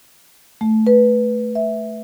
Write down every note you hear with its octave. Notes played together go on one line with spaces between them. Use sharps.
A3
B4
E5